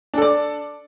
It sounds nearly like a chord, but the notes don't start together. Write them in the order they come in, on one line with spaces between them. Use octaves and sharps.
D4 A4 D5